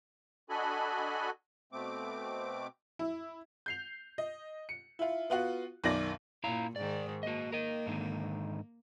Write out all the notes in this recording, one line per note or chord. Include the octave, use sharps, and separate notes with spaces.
D4 F#4 A4 D#5 G#5 B5
B2 A3 C4 D6
E4
G6 C7 F7
D#5
C#7
E4 F4
B3 F4 F#4
B1 F#2 D#3 D5 A#6 F#7
A#2 E4 F5 A#5
G#2 D#3 D5
A#3 F#4 D#5
A#4 D#5
G#2 D3 D#3